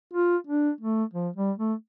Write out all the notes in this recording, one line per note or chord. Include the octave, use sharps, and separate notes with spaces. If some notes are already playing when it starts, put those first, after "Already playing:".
F4
D4
A3
F3
G3
A3